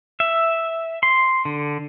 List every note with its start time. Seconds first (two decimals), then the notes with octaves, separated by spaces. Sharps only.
0.20 E5
1.03 C6
1.45 D3